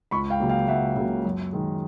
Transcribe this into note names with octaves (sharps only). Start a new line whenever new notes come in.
C#2 B5 C#6
F5 G5
C#3 F#3 A#3
F5 G5
C#2 E5 F#5
C#3 F#3 A#3
F#2
D#3 G#3